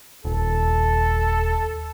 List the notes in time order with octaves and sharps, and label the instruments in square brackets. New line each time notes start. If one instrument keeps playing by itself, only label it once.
[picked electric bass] D#1 [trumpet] A4